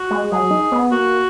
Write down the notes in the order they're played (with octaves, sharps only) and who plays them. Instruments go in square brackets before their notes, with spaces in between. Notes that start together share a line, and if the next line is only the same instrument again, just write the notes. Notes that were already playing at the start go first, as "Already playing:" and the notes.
Already playing: [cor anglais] F#4
[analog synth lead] G#3
[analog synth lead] F#3 [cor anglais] G#4
[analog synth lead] D#4
B3
[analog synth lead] A#3 [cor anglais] F#4